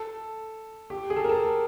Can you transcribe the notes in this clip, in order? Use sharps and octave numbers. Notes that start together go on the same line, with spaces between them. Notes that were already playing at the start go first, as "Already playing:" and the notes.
Already playing: A4
G4
G#4
A4
A#4
A4